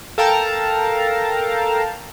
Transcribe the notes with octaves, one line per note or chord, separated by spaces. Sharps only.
A4 A#4 F5 G5 A5 A#5